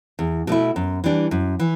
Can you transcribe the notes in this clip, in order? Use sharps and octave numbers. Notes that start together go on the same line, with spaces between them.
E2
B2 A3 E4
F#2
E3 G3 D4
F#2
E3